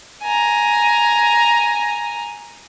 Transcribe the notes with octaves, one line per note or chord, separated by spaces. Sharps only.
G#5 A#5